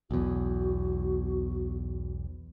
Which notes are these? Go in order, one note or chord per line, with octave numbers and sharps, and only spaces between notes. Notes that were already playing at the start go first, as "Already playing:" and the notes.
B1 E2 F#4